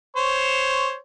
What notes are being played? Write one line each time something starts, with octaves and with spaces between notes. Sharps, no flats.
C5 C#5